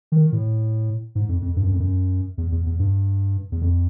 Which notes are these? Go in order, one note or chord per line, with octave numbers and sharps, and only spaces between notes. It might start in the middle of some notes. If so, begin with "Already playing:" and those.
D#3
A2
G#2
F2
F2
G2
F#2
F2
F#2
E2
E2
E2
G2
E2
F2